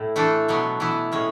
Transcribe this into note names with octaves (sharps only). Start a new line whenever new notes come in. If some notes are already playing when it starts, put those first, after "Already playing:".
Already playing: A2 E4
E3 A3 D4 A4
B2 F#3 B3
E3 B3 E4
A2 G#3 C#4